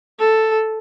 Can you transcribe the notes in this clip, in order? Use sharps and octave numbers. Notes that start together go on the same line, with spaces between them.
A4